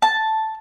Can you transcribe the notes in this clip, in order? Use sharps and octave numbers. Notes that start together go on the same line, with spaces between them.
A5